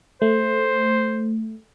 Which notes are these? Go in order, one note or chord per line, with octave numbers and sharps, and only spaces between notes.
A3 C5